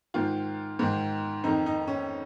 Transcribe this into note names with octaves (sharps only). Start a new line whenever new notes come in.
G#2 D#3 F4
G#2 D#3
F2 D#3 D#4
D#4
C#4